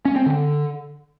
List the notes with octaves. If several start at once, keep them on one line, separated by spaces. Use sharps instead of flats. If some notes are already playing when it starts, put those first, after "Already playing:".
C#4
C4
D3